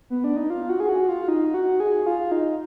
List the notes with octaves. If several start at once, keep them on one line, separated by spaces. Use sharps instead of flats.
B3
D4
D#4
F4
F#4
G#4
F#4
F4
D#4
F#4
G#4
F4
D#4